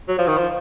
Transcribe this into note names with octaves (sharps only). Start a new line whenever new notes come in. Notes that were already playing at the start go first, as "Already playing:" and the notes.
F#3
F3
D#3
F3